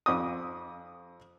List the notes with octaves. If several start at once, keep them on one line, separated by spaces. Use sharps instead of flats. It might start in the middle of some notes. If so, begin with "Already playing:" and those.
F2 D6 D#6